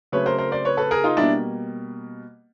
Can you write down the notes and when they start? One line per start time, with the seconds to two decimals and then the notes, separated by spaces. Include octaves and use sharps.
0.12 C#3 F#3 A3 C4 B4 C#5
0.26 A#4 C5
0.38 A#4 C5
0.52 C5 D5
0.65 B4 C#5
0.77 A4 B4
0.91 G#4 A#4
1.04 D#4 F4
1.17 B2 G3 A#3 D4 E4